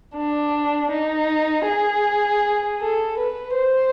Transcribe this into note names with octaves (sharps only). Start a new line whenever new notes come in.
D4
D#4
G#4
A4
B4
C5